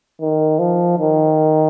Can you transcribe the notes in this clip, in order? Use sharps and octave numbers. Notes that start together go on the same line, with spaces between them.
D#3
F3
D#3